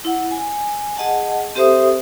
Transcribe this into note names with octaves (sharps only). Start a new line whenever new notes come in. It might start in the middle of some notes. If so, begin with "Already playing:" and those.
E4 F#5
G#5
G#4 D#5 F#5 A5
C4 G4 A4 C5 E5 D#6